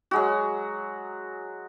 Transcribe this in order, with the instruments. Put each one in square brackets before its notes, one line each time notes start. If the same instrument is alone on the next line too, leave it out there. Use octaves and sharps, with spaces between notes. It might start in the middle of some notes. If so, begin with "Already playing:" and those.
[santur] F#3 G#3 F#4